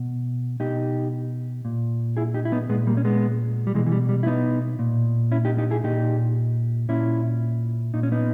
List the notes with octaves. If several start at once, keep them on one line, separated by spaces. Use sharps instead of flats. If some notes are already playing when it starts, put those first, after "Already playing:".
Already playing: B2
B2 D#4 G4
A#2
E4 G#4
D#4 G4
E4
B3 D#4
A#2 G#3 B3
G3 A#3
C#4
G#3 B3
G3
B2 E3 G#3
E3
G3
G3
E4
B3 D#4
A#2
C#4 E4
D#4 G4
D#4 G4
E4 G#4
A#2 D#4 G4
A#2 C#4 E4
A#2 D#4
C#4
B3 D#4